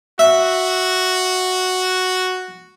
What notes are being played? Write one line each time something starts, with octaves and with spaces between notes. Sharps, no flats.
F#4 E5